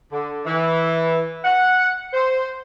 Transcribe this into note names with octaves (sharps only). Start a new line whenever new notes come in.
D3
E3
F#5
C5